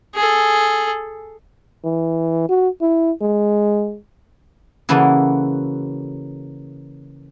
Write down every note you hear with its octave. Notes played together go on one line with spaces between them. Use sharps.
G#4 A4
E3
F#4
E4
G#3
C#3 E3 A#3 E4 F#4 A4